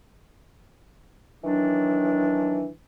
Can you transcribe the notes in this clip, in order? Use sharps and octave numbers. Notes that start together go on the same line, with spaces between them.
D#3 E3 F#3 D4